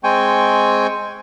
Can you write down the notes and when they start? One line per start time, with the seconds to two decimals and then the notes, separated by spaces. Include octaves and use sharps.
0.04 G#3 C4 G5 G#5 C#6